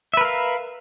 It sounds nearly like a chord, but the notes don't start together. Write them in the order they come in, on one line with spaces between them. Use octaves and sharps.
E5 B4 A#4 F5